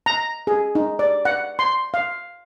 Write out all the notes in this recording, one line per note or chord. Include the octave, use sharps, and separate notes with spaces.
A#5
G#4
D#4
D5
F#5
C6
F5